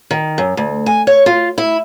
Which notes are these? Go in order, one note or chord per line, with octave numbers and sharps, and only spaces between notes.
D#3
F#2
D2
G#5
C#5
F4
E4